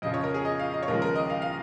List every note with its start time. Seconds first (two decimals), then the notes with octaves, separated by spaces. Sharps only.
0.02 F2 C#3 F3 D#5
0.14 C#5
0.24 A#4
0.34 G#4
0.45 D#5
0.59 F5
0.73 D#5
0.83 C#5
0.88 D#2 C#3 F3 G#3 A#4
1.02 A#4
1.15 D#5
1.30 F5
1.42 F5